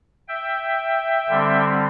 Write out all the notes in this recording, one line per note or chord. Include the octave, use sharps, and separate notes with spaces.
E5 G5
D3 G3 C4